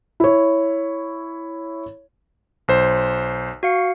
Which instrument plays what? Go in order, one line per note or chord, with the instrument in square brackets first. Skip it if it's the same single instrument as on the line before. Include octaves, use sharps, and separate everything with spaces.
[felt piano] E4 C#5
[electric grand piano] B1 C5
[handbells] F#4 F5 C#7